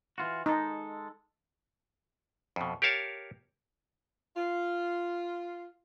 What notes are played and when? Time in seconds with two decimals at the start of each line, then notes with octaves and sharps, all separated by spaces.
0.18 E3 F4 F#4
0.46 G#3 D#4 A4
2.56 F2 B2
2.82 G4 A#4 C#5 F5 A5
4.36 F4